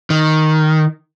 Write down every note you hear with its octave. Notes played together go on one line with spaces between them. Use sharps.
D#3